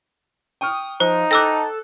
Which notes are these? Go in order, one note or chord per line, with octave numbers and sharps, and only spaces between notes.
G5 C#6 D#6 F6
F3 D#4 C5
A4 G5 A5 D6 E6 F#6 A#6